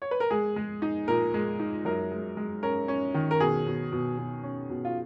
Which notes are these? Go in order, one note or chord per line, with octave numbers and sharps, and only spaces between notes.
C#5
B4
A#4
G#3 G#4
G#3
D#4
A#2 A#4
G#3
D#4
F#2 A#4
G#3
G#3
C#4 A#4
C#4
D#3
A#4
B2 G#4
B2
B2
B2
C#4
B2
F4